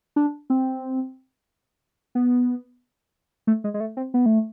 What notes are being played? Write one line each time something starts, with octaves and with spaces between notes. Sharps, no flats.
D4
C4
B3
A3
G#3
G#3
A3
C4
B3
A3